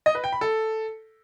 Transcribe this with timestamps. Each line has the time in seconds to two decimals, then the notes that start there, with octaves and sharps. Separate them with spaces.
0.06 D#5
0.15 B4
0.24 G5
0.32 B5
0.41 A4